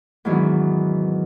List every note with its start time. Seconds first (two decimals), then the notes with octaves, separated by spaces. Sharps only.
0.25 E2 G#2 D#3 F#3 B3 D4